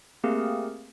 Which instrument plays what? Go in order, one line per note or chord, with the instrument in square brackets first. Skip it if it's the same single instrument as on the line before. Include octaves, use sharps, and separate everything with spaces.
[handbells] A3 A#3 C4 G4 G#4 A#4